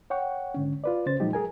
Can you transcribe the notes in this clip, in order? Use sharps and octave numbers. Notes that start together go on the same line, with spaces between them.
C#5 F#5 G5 C#6
G#2 D3 C#4
F4 B4 D5
C#3 C#4 C5 A6
A#2 F3 F#3 G#3 D#4 G4
G#4 A#4 G#5